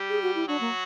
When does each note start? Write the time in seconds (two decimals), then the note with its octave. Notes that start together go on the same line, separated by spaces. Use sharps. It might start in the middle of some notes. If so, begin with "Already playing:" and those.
Already playing: G3 G4
0.09 G#4
0.22 F#4
0.35 E4
0.47 F#3 D4 F#4
0.61 A#3